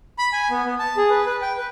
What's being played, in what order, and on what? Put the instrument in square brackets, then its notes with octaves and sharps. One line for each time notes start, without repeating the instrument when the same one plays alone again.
[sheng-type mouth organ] B5
G#5
B3
B3
A5
G#4
B4
B4
G5
B4